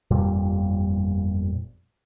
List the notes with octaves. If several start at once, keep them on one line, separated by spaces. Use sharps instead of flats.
G1 F2 A#2 G3